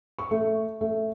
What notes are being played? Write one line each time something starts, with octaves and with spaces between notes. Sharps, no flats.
C#6
A3
A3